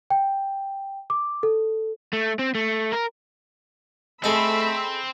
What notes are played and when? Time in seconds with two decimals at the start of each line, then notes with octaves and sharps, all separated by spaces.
0.10 G5
1.10 D6
1.43 A4
2.13 A3
2.39 C4
2.55 A3
2.92 A#4
4.24 A3 C4 G#4 A4 D#5 B5 E6